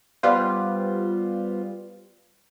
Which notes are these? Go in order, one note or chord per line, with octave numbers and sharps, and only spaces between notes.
G3 B3 F4 C5